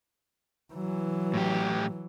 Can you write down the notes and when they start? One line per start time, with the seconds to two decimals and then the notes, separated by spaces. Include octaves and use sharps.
0.74 E3 F#3
1.34 A2 G4